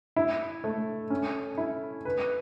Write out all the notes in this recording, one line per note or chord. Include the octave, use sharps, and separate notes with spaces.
E4
A3
C#4
E4
B4